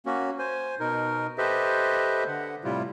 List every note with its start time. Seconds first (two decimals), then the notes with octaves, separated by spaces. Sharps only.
0.06 A#3 C#4 F#4
0.39 C5 G#5
0.80 B2 D#4 A#4
1.38 G4 A4 B4 C5 D#5 E5
2.28 D3 F#5
2.64 A2 C3 G3 E4 F4